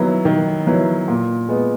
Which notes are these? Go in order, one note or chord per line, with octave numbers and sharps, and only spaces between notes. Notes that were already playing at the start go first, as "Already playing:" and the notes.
Already playing: D#3 F#3 B3 E4
D#3
F#3 B3 E4
A#2
G#3 B3